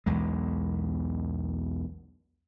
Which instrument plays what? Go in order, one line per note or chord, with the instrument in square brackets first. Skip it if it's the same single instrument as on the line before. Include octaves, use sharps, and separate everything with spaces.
[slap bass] B1 E2 G#3